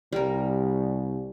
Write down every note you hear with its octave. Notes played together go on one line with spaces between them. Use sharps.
C2 G3 A#4